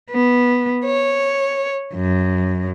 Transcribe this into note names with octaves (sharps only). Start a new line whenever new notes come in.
B3
C#5
F#2